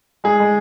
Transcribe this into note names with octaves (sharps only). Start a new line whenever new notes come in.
G#3 G#4
G#3